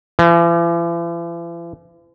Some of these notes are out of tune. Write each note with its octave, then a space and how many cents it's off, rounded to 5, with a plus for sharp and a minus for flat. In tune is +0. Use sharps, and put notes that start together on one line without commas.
E3 +45